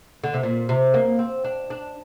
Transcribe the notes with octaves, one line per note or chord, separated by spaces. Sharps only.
D3
C3
A#2
C3
A#3
C4
D4
D4